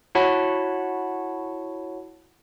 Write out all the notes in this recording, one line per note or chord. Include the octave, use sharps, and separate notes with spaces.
E4 F#4 C#5 F#5 A5 B5